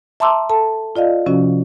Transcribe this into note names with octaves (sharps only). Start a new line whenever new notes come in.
E5 A5 A#5 C6 D6 E6
A4 A5
F4 D5 D#5 F5
C3 F3 C#4 F#4